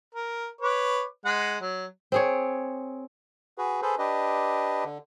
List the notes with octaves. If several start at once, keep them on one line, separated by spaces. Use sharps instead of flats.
A#4
B4 C#5 D6
G#3 F#5
F#3
C4 G#4 C#5
F#4 G#4 B4
G#4 A4 B4 C5
D4 G4 B4 D#5
D3